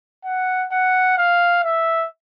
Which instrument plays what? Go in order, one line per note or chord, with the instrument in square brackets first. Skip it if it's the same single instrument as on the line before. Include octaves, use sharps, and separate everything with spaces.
[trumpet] F#5
F#5
F5
E5